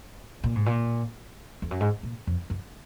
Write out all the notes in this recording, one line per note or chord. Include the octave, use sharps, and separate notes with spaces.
A#2
G#2
A#2
F2
F#2
G#2
A#2
F2
F#2